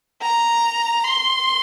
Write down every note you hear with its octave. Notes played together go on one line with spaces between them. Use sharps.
A#5
C6